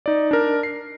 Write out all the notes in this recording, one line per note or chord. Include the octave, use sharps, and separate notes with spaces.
D#4 D5
D4 A#4
C7